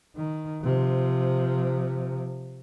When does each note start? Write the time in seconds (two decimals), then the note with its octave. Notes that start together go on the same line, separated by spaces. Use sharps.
0.16 D#3
0.63 C3 F3